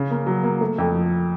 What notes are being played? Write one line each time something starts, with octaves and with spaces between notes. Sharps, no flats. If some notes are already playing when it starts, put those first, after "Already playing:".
Already playing: C#3
A#3
F#3
A#3
A3
F2
F3